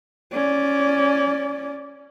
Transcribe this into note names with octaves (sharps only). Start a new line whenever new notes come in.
C#4 D5